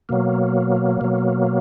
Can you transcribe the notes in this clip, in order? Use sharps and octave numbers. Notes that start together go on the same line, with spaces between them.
B2 F#3 A#3
B2 F#3